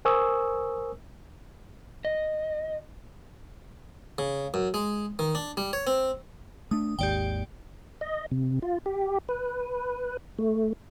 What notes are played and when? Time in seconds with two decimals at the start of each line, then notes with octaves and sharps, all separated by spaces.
0.05 A#4 C5 G#5 C#6 D#6 E6
2.05 D#5
4.18 C#3
4.54 F#2
4.74 G#3
5.19 D#3
5.35 D4
5.57 G3
5.73 C#5
5.87 C4
6.71 A3 D4 D#6
6.99 G#1 D#2 G#2 G4 D5 G5
8.01 D#5
8.31 C3
8.62 F4
8.86 G4
9.29 B4
10.39 A3